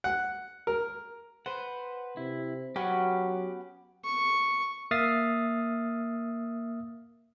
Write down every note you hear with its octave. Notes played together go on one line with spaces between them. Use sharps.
F#5
A#4
B4 C5 F#5
C3 E4
F#3 B3 C#4 F#4 G4 F#5
C#6
A#3 E5 D#6 F6 A6 C7